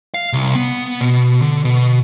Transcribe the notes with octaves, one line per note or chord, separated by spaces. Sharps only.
F5
C2
B3
B2
D3
B2